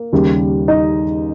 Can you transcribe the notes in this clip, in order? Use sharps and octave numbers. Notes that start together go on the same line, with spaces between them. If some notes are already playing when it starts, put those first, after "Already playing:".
Already playing: A#3
D#2 C#3 G3
D#4 D#5